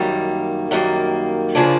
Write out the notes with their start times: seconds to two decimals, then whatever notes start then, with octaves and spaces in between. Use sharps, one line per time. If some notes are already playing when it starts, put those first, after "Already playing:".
Already playing: F#2 D#3 G3 A#3
0.71 F#2 D#3 G3 A#3
1.55 C#3 F3 A#3 D4